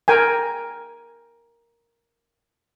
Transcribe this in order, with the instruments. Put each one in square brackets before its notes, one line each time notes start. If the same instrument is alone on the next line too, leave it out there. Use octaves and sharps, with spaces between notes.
[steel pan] A#4 G5 G#5